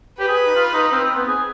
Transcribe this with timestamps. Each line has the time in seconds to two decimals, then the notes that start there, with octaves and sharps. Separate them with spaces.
0.19 G4 B4
0.28 G#4
0.46 D#4
0.56 F4
0.74 D#4
0.92 C4
1.04 C4
1.16 B3
1.28 G#4